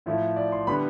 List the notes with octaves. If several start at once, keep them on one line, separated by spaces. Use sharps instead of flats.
A2 F3 A3 E4
D5
C6
D3 G3 B3 B5